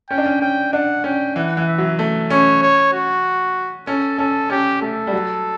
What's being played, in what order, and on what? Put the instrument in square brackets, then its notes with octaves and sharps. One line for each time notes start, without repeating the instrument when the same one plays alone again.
[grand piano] C#4 [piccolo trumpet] G5
[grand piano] D4
C#4
[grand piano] C#4 [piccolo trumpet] G5
[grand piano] D4 [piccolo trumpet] F#5
[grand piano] C#4 [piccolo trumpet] G5
[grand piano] E3 [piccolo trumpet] F#5
[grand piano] E3
[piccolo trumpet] E5
[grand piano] F#3
A3
[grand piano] C#4 [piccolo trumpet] C#5
[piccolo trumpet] C#5
F#4
[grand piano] C#4 [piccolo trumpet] A4
[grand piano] C#4 [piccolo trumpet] A4
[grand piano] C#4 [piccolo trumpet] G4
[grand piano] A3 [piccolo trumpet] A4
[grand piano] G3
F#3